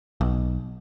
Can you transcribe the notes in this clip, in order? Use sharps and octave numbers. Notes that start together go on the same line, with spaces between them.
B1